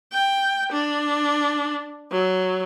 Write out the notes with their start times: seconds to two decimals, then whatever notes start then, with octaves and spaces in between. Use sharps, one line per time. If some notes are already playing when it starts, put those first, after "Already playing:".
0.13 G5
0.72 D4
2.12 F#3